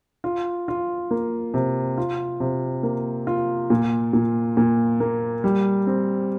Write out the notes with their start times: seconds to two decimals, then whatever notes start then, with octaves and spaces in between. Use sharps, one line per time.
0.24 F4
0.68 F4
1.11 A#3
1.54 C3
1.98 F4
2.40 C3
2.83 A#3
3.27 F4
3.70 A#2
4.13 A#2
4.57 A#2
5.00 A#3
5.44 G3
5.87 C4